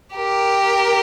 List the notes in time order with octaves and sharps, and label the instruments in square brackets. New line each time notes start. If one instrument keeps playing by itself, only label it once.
[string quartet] G4 A#4